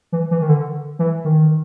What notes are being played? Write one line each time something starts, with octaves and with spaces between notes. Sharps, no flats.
E3
E3
D#3
D3
E3
D#3